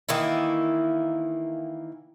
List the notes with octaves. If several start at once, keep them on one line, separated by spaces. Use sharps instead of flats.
D#3 E3 A#3 E4